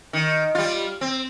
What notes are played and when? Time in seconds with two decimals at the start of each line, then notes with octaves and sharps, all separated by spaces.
0.13 D#3
0.55 G3 F4
1.01 C4